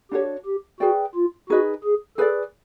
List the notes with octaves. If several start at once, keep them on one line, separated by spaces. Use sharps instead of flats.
D4 F#4 G4 A4 C#5
G4
F#4 G#4 B4 D5 G5
F4
D#4 F#4 G#4 B4 D#5
G#4
G#4 A4 B4 D5